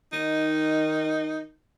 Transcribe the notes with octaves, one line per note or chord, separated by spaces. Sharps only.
D#3 D#4